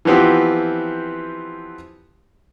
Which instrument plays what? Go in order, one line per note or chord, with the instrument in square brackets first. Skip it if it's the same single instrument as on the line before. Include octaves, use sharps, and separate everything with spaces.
[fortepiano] E3 F3 B3 C4 G4